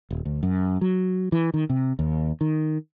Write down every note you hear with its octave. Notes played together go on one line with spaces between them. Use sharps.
D#1
D2
F#2
F#3
E3
D#3
C3
D#2
D#3